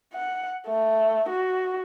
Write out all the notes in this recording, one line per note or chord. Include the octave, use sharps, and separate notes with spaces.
F#5
A3
F#4